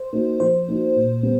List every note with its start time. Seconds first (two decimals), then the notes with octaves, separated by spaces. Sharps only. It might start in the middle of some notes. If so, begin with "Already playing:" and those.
Already playing: C5
0.13 A#3 D#4 F#4
0.40 F3 C5
0.68 A#3 D#4 F#4
0.96 A#2
1.23 G3 B3